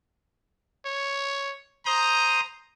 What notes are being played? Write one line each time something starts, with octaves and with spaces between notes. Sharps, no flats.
C#5
C5 A#5 D#6 G6